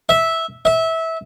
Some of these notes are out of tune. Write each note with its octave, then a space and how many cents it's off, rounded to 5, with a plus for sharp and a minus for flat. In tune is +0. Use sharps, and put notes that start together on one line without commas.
E5 -10
E5 -20